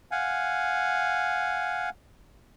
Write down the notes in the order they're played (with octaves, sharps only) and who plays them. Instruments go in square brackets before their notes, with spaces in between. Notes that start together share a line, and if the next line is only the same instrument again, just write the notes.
[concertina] F5 F#5 G#5